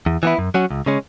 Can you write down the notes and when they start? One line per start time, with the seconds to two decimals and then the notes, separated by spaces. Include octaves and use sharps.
0.06 E2
0.23 E3 B3 E4
0.38 F#2
0.54 F#3 C#4 F#4
0.70 C#2
0.86 C#3 G#3 C#4